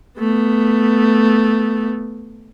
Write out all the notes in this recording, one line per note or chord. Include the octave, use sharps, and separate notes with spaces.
A3 B3